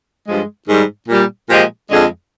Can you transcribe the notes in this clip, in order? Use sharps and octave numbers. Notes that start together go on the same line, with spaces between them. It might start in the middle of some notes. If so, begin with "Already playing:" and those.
G2 F3 G#3
G#2 D#3 G3
A#2 G3
A#2 F3 G#3 G4
F2 D3 G#3 G#4